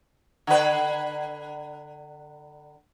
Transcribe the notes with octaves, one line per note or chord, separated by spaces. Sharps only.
D3 B4